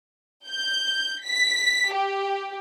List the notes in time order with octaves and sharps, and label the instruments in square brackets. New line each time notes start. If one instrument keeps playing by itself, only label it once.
[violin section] G6
B6
G4